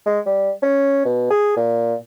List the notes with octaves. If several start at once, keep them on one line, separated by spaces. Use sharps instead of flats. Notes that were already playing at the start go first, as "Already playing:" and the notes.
G#3
G3
C#4
B2
G#4
A#2